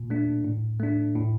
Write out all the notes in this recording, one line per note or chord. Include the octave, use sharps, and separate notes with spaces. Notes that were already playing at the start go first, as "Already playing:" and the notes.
Already playing: A#2
A3 D4
A2
A3 D4
A2